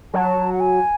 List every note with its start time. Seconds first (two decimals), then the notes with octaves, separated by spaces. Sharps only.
0.14 F#3 A5
0.53 F#5
0.60 G#5